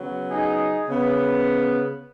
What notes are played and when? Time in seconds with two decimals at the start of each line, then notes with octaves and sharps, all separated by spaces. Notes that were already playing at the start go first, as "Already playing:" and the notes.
Already playing: C#3 F#3 B3
0.30 D#4 G#4
0.89 C#3 B3